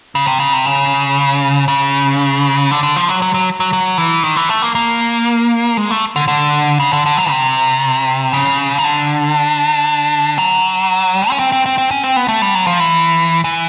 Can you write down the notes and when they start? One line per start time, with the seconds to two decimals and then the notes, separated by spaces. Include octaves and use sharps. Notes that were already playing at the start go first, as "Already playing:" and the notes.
0.15 C#3
0.27 C3
0.40 C#3
0.53 C3
0.65 C#3
1.68 C#3
2.71 D3
2.83 D3
2.96 F3
3.09 F#3
3.22 F#3
3.34 F#3
3.60 F#3
3.73 F#3
3.98 E3
4.23 D#3
4.36 E3
4.49 A3
4.62 A#3
4.75 A#3
5.77 G#3
5.91 A3
6.16 D3
6.28 D3
6.80 C#3
6.93 D3
7.06 D3
7.17 F#3
7.30 C3
8.33 C#3
8.78 D#3
8.84 D3
10.38 F#3
11.30 C#4
11.39 C4
11.52 C4
11.66 C4
11.78 C4
11.91 C#4
12.03 C4
12.16 B3
12.28 A3
12.42 G3
12.55 F#3
12.67 F3
12.80 E3
13.44 E3